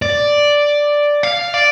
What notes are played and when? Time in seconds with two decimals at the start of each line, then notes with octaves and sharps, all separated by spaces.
0.02 D5
1.23 F5
1.54 D5